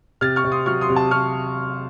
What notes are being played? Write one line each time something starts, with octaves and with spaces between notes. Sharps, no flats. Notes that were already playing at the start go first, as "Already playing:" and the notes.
C3 F6 A6
C#6 F6
C3
C6 D#6
F#3 C#6 F6
C6 D#6
C3
A5
C3 C#6 F6